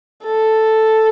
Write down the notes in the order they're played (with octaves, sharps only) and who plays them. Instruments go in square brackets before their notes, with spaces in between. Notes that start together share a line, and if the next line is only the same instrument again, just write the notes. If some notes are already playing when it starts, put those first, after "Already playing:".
[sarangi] A4